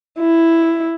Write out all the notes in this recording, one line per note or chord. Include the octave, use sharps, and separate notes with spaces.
E4